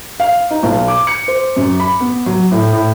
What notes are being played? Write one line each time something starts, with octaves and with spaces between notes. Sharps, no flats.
F5
D#4
B1
D6
C#7
C5
F#2
B5
B3
F#3
A2
A2